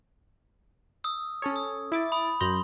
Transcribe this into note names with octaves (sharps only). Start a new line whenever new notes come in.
D#6 E6
C#4 A4 C#5
D#6
E4 D6 A6
B5 D#6
F#2 A#5 C6 G6